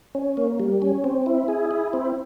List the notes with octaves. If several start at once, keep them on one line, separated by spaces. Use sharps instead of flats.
C#4
A#3
G3
C#4
C4
E4
G#4
E4
C4